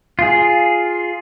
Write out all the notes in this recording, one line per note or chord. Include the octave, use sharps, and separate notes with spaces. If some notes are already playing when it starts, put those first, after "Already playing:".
F4 G#4